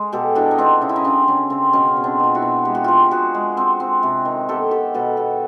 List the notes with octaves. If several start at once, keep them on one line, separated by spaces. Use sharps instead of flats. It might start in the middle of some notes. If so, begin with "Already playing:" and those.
Already playing: G#3
B2 G4 A4
B2 D4 E4
D#4
B2 C4 D4
C#3 D#4
E4
C#4 D#4
C#3 C4 D4
C#3 C#4
C#3 C4
B2 C#4
B2
C4 D4
B2 F4
E4 F#4
B2
G#3 G4
F#4
F3 F4 G4
F3 F#4 G#4
G#3
C4
C4
C3
D#3
B3 G4 A4
B3 G4 A4
B2 A4 B4
B3 G4 A4